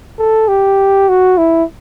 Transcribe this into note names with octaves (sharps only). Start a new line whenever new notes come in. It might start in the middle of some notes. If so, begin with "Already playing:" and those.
A4
G4
F#4
E4